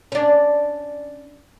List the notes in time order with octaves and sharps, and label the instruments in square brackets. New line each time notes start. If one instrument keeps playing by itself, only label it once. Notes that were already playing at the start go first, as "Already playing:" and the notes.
[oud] C#4 D4